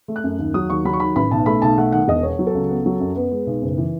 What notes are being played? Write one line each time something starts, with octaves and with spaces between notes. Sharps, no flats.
A3
F#6
F#2
D#2
F#3 D#6
D#2 C#6
F#3 B5
C#6
D#3 B5
A1 B5
B1 A5
A3 B5
B1 A5
A3 F#5
D#3 F#5
E1 D#5
B3 C#5
F#3
A4
C#2
B3
F#3
F#2
B3 B4
G#3
B1
F#1
E3